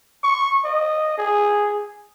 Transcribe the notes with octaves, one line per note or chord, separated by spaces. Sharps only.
C#6
D#5
G#4